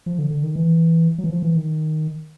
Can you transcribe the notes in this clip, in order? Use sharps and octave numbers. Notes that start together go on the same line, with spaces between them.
F3
D3
D3
D#3
E3
F#3
E3
F3
E3
D#3